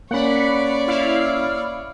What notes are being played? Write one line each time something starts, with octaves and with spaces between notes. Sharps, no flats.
A#3 C#4 C#5 D5 F#5 B5
E4 F5